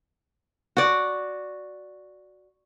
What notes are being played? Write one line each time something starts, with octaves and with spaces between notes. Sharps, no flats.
F#4 D5